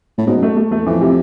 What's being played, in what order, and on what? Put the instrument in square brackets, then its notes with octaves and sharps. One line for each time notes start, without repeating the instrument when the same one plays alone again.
[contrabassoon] A2
[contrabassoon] G#2 [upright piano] B2
[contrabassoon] F#2
[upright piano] A3
A3
[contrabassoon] E2 [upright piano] A3
[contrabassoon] F2 [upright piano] E3
[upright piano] C3